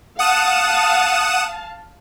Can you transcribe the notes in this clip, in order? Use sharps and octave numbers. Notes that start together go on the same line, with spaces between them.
F5 F#5 A5 D#6 E7